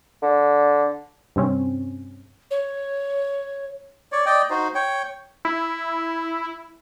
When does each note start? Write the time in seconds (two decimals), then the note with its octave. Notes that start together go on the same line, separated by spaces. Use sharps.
0.22 D3
1.36 G2 C3 C4 C#4
2.51 C#5
4.12 C#5 D5
4.26 D5 D#5 G5
4.50 D#4 F#4 C5
4.75 C#5 G5
5.45 E4